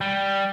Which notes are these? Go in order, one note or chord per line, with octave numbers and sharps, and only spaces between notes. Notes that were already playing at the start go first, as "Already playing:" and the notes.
G3